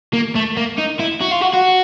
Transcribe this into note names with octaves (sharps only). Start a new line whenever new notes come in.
A#3
A3
A#3
D#4
E4
F#4
F4
F#4
F#4